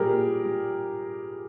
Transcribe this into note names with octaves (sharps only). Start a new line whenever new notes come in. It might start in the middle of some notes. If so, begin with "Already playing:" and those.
Already playing: A#2 G3 G4 G#4 A#4
A#2
G3